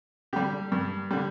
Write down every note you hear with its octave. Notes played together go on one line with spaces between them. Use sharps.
D3 G3 G4
G2
D3 G3